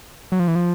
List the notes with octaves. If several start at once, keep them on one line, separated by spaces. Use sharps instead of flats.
F#3
F3
E3
F3